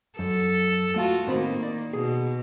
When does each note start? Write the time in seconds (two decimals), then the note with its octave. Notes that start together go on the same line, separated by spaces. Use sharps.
0.19 F#2 A4
0.96 A3 F4 F#4 F5 A5
1.27 A2 D#3 A#3 C4 B5
1.63 D5
1.93 B2 G#4